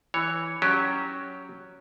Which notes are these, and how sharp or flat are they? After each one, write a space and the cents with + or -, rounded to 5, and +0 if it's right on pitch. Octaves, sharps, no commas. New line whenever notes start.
E3 +0 C#5 +0
F#3 +0 C#4 +10 G4 +0